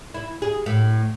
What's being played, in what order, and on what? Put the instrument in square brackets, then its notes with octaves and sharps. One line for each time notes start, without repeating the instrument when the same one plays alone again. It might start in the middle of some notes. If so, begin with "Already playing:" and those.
[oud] E4
G#4
A2